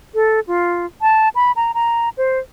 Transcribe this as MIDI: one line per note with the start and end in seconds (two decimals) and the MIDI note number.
0.14 0.40 69
0.47 0.86 65
1.02 1.29 81
1.35 1.52 83
1.56 1.72 82
1.74 2.09 82
2.18 2.39 72